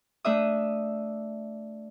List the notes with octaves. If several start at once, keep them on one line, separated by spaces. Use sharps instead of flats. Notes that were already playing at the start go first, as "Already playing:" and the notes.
A3 D4 E5 D#6